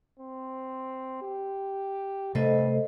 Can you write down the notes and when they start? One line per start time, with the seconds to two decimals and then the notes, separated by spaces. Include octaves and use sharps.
0.19 C4
1.22 G4
2.35 G2 C3 A3 A4 C5 D#5